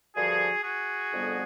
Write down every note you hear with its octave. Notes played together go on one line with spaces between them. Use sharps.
G2 D3 F3 F#4 G#4
F#4 G#4
F2 D3 G3 B3